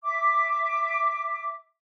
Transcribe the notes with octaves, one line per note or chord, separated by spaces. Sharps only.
E5 D6